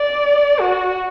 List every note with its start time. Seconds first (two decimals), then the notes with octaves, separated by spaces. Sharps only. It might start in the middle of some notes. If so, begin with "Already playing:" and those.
Already playing: D5
0.60 F#4